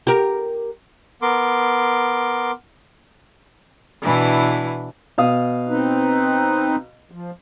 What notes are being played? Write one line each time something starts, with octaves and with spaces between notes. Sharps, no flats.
G4 A#4
B3 A#4 C6 D6
B2 E3 D4 E4
B2 F5 D#6
C4 D#4 B4
F3